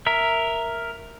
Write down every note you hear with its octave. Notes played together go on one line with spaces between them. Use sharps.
A#4 E5